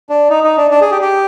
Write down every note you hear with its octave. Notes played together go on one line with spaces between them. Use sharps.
D4
D#4
D#4
D4
D4
G#4
G4
G4